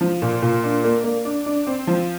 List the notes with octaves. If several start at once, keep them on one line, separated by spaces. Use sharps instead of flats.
F3
A#2
A#2
D4
A#3
A#3
D4
D4
C4
F3